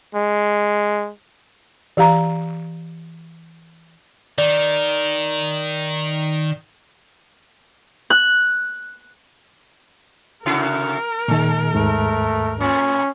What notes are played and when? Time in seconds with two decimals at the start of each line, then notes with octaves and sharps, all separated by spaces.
0.15 G#3
1.97 E3 G4 F5 A#5
4.38 D#3 D5
8.10 F#6
10.46 C3 E4 F#4 A#4
11.28 A#2 D#3 G#3
11.74 D#2 G#2 A3
12.60 A2 C#4